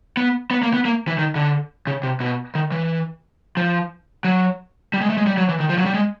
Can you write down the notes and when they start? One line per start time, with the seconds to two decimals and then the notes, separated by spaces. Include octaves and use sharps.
0.17 B3
0.51 B3
0.63 A#3
0.74 B3
0.85 A#3
1.08 E3
1.18 D#3
1.35 D3
1.87 C#3
2.03 C3
2.20 B2
2.55 D#3
2.72 E3
3.57 F3
4.24 F#3
4.94 G3
5.01 G#3
5.10 A3
5.17 G#3
5.27 G3
5.37 F#3
5.49 E3
5.60 D#3
5.69 F3
5.78 F#3
5.86 G3
5.94 G#3